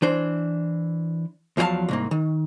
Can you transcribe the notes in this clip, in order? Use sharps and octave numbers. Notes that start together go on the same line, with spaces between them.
E3 D4 C5
E2 F3 F#3 E4 F5 A5
C2 G#2 A#3
D#3